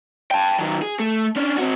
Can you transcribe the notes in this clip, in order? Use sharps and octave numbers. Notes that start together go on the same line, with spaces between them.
G5 A5
D#3 F#3
G#4
A3
C#4 D4
C4 F#4